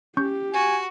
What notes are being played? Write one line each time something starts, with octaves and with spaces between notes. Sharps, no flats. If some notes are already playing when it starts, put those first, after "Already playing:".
C#4 G4 C#6 G6
F#4 G#5